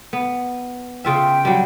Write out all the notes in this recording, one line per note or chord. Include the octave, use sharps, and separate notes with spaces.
B3
C#3 F4 E5 G5
F#3 G3